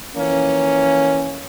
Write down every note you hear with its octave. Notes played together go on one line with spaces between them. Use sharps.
E3 F3 A#3 C#4